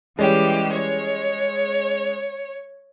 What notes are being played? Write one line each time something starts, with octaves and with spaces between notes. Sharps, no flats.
E3 G3 G#3 C#4 G4
C#5